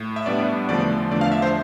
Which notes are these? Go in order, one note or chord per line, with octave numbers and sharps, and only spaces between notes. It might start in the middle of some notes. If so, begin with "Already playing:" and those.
Already playing: A2
E5
A2 G3 B3 D4 D5
E2 D3 F3 A3 D4 D5
E2 D3 F3 A3 D4 D5
F5
E5
C5